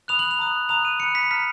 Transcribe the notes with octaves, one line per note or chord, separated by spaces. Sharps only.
B5 D#6 F#6 F7
F#7
F7
A#5 D#6 F#6
A#5 D#6 F#6 F7
D#7
B5 F#6 C#7
B6
A#5 F6 B6